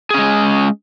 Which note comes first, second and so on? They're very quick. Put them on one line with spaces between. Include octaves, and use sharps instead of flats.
G#4 C#4 G#3